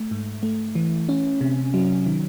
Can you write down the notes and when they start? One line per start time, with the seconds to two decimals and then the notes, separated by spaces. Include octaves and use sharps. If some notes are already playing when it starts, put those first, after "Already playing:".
Already playing: A3
0.11 G#2
0.43 A3
0.75 E3
1.09 C#4
1.41 C3
1.74 F#3
2.06 D#3